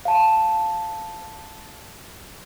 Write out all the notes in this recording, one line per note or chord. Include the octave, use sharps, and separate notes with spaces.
F5 A5